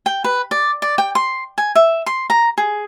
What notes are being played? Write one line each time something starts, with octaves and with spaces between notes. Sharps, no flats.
G5
B4
D5
D5
G5
C6
G#5
E5
C6
A#5
G#4